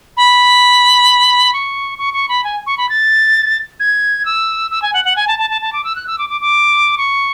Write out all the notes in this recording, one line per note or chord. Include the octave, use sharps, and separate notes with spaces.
B5
C#6
C#6
C#6
B5
G#5
C#6
B5
A6
G#6
E6
E6
G#5
F#5
F#5
G#5
A5
A5
A5
A5
D6
E6
F#6
E6
D6
D6
D6
C#6